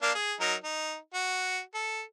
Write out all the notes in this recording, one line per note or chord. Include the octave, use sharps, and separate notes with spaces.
A#3 D4 F5
G#4
F#3 D#4 A#4
D#4
F#4
A4